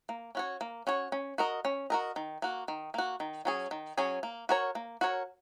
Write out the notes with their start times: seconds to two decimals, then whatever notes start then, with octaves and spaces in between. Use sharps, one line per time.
0.09 A#3
0.35 C#4 F#4 C#5
0.61 A#3
0.87 C#4 F#4 C#5
1.12 C#4
1.38 F#4 A#4 D#5
1.65 C#4
1.90 F#4 A#4 D#5
2.16 D#3
2.42 A#3 F#4
2.68 D#3
2.94 A#3 F#4
3.20 D#3
3.45 F#3 C#4 G#4
3.71 D#3
3.97 F#3 C#4 G#4
4.23 A#3
4.49 F#4 A#4 C#5
4.75 A#3
5.01 F#4 A#4 C#5